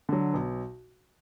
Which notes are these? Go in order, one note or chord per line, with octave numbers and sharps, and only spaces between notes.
D3 F#3
B1